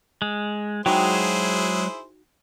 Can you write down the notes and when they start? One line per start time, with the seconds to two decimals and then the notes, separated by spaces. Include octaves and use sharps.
0.22 G#3
0.86 F#3 G#3 D#4 E4 F#4 G#4 C5 G5